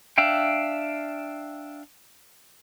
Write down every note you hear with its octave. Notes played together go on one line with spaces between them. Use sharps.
D4 E5 F5 G5